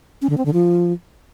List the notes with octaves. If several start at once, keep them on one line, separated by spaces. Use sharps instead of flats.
C#4
D3
C4
D3
F3